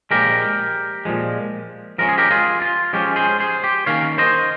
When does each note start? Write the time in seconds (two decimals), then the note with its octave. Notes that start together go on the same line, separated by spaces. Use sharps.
0.11 A#2 F3 G#3 G4 A#4
1.05 A#2 F3 G#3
1.98 F3 G#3 C#4 A#4
2.09 G#4
2.18 G4 A#4
2.31 F4 G#4
2.62 F4
2.93 F3 G#3 C#4 G4
3.16 G#4 C5
3.40 G#4 C5
3.64 G4
3.86 D#3 A#3 C#4 C#5 F5
4.18 C5 D#5